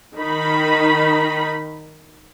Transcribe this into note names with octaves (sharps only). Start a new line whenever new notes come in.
D#3 D#4 B5